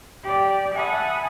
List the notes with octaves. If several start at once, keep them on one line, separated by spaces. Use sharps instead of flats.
G4 D5
E5 F#5 G#5 A5 B5 D#6